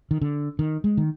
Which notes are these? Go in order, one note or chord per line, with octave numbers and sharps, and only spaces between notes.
D#3
D3
D#3
G#3
D#3